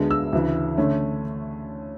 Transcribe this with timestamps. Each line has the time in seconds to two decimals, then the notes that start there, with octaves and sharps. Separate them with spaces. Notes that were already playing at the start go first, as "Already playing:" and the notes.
Already playing: D2 D3 G#3 B3 D4
0.11 E6
0.33 D2 C#3 E3
0.77 D3 A3 C#4